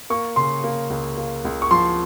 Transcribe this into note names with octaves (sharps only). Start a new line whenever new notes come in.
A#3 C#6
C#3 C6
A#3
C#2
A#3
C#2
C#6
F3 C6